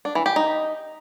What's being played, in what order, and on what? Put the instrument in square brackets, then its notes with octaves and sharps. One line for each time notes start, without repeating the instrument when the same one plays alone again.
[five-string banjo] D4
E3
G4
D#4